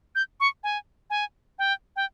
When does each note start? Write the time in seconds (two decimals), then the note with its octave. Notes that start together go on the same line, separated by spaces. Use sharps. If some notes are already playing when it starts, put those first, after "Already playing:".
0.15 G6
0.40 C#6
0.64 G#5
1.10 G#5
1.59 G5
1.96 G5